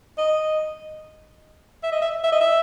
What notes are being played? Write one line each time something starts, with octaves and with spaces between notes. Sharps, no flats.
D#5
E5
D#5
E5
E5
D#5
E5